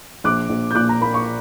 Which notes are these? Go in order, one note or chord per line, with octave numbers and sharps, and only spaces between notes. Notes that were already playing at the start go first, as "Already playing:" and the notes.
A#1 D6 F#6
A#1
G6
A#2 D6 F#6
A#5
A#3 B5
C#6